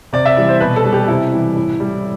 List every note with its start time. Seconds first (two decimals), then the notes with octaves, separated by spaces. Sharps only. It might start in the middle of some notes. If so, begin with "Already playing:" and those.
0.13 C3 D5
0.26 E5
0.36 E3 G3 D5
0.49 C5
0.60 B2 B4
0.76 A4
0.85 G3
0.93 G4
1.08 C3 E4
1.32 E3 G3
1.56 A2
1.80 G3